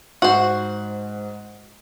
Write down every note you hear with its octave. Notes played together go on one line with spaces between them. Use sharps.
G#2 F#4 C5